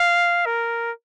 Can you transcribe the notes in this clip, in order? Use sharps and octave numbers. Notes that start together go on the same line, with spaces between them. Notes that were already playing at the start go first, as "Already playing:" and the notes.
Already playing: F5
A#4